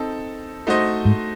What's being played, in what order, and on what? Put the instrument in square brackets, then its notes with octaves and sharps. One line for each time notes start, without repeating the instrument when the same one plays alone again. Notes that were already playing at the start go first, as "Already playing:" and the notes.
Already playing: [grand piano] C4 D#4 A4
A3 D#4 F#4 C5 D#5
[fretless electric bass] G#2